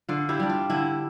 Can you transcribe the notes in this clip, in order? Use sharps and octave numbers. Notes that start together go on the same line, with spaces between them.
D3 F4
E4 G4
G3 D4
F4
D3 E4